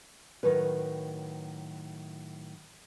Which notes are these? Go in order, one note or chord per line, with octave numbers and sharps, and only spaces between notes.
A2 D#3 E3 F#3 B4